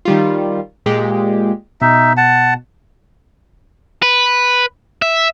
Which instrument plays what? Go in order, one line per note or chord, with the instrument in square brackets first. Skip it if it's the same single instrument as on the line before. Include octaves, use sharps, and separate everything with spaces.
[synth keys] D#3 G3 F4
A#2 G#3 G4
[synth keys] B2 [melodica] D#4 E5
[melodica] F#5 A5
[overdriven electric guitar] B4
E5